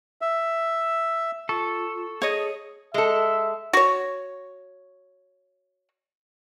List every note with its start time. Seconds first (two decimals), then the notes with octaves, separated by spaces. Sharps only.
0.21 E5
1.49 F4 A4 C#6
2.22 G#4 C#5 D#5
2.94 G#3 A4 E5
3.73 F#4 C#5